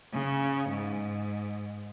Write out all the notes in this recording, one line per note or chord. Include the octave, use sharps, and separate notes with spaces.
C#3
G#2